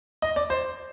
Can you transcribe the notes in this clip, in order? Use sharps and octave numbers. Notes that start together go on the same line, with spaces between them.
D#5
D5
C5